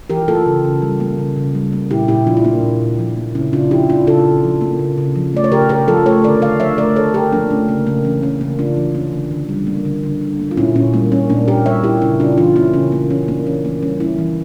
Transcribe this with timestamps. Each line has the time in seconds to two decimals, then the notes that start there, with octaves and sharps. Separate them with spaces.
0.10 E3 G4 A#4
0.28 A#3 F4 A4
0.46 C#3
0.64 C#3
0.82 G3
1.00 A#3
1.19 C#3
1.36 C#3
1.55 G3
1.73 A#3
1.91 A#2 E4 G4
2.08 A#2 E4 G4
2.27 F3 D4 F4
2.37 E4
2.45 A#3 D4
2.63 A#2
2.81 A#2
2.99 F3
3.17 A#3
3.35 C#3 C#4 E4
3.53 C#3 D4 F4
3.71 F3 E4 G4
3.89 A#3 D4 F4
4.07 C#3 F4 A4
4.25 C#3
4.43 F3
4.61 A#3
4.79 C#3
4.98 C#3
5.16 F3
5.34 A3 D5
5.44 C#5
5.52 C#3 G4 A#4
5.69 C#3 G4 A#4
5.88 F3 F4 A4
6.06 A3 A4 C#5
6.24 D3 A#4 D5
6.42 D3 D5 F5
6.60 F3 C#5 E5
6.78 A3 A#4 D5
6.96 D3 A4 C#5
7.14 D3 G4 A#4
7.32 F3 A#3 D4
7.50 A3 C#4
7.68 C#3 A#3
7.87 C#3 A#3
8.05 E3 C#4
8.23 A#3 C#4
8.41 C#3 A#3
8.59 C#3 D4 F4
8.77 E3
8.95 A#3 C#4
9.13 D3
9.31 D3
9.49 G3
9.67 A#3
9.85 D3
10.03 D3
10.22 G3
10.39 A#3
10.51 F4
10.57 A#2 C#4 E4
10.76 A#2 C#4
10.94 G3 A#3
11.12 A#3 C#4
11.30 A#2 A#3 D4
11.48 A#2 G4 A#4
11.66 G3 C#5 E5
11.84 A#3 E4 G4
12.02 C#3 C#4 E4
12.20 C#3 D4 F4
12.38 E3 D4 F4
12.56 A#3 C#4 E4
12.74 C#3 C#4
12.92 C#3 A#3
13.10 E3 C#4
13.28 A#3 D4
13.46 E3 C#4
13.64 E3 A#3
13.82 G3 C#4
14.00 A#3 C#4 E4
14.18 E3